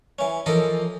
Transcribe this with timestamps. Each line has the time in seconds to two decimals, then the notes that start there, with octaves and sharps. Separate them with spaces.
0.19 E3 C#4
0.46 E3 F3 A4 A#4 D#5